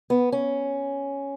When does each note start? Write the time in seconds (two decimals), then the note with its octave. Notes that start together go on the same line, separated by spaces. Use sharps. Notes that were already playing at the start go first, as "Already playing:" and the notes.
0.10 B3
0.32 C#4